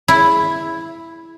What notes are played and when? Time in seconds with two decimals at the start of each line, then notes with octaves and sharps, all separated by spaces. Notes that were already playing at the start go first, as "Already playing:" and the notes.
0.08 E4